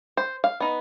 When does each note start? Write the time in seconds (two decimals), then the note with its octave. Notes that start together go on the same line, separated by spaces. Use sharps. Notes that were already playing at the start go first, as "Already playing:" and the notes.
0.17 C5
0.44 F5
0.60 B3 D#4